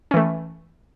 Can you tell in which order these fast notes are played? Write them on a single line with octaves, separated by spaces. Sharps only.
C#4 E3 A3